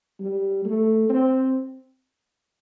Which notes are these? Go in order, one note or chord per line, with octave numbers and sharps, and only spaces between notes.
G3
A3
C4